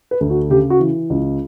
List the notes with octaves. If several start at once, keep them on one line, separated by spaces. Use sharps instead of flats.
B4
D2
F#4
C#3 G4
F#4
E3
C#2